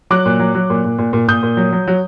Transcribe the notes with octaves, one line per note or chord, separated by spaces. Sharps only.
F#3 D6 F#6
A#2
F#3
F#3
A#2
A#2
A#2
A#2
A#2 D#6 G6
A#2
F#3
F#3
F#3